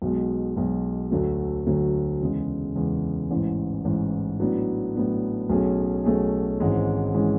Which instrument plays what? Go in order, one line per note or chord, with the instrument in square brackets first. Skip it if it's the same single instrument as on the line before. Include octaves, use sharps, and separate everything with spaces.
[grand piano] B1 B2 G#3
B1 B2 G#3
D2 D3 F#3 A3
D2 D3 F#3 A3
E2 C#3 G#3
E2 C#3 G#3
A1 G#2 E3
A1 G#2 E3
A2 F#3 B3 D4
A2 F#3 B3 D4
B1 B2 A3 C#4 G#4
B1 B2 A3 C#4 G#4
G#1 G#2 E3 G#3 C#4
E3 G#3 C#4